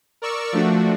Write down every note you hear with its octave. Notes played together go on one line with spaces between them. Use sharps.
A#4 D5 C#6 E6
F3 A3 D4 F#4